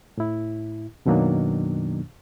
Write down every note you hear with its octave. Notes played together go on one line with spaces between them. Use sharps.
A2 E4
F#2 B2 D#3 F#3 A#3 D4